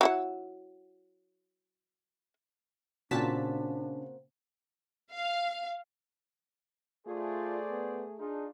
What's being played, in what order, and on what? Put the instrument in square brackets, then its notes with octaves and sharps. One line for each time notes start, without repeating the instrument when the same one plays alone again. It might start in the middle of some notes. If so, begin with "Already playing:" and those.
[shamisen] F#3 E4 F#5
[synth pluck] A#2 A5 B6 [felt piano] C#3 [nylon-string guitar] A#3 C4 F#4 [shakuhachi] D4
[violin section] F5
[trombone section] A3 G#4 [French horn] F4 [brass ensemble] A4 C5 D5
[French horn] B3
[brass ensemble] D4 D#4 F4 [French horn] G#4